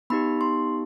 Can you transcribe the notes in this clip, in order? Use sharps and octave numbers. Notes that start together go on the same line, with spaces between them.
B3 D#4 G4 B5
C6